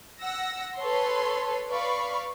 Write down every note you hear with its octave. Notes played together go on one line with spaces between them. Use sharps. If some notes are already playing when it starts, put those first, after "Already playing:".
F#5 E6 A#6
A4 B4 C#5 C6
B4 D5 F5 B5 C#6